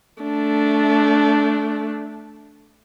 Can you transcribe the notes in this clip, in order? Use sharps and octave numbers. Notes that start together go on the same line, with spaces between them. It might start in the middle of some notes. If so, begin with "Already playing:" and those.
A3 D4